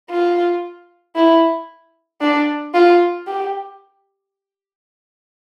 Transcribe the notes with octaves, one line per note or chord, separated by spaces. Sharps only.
F4
E4
D4
F4
G4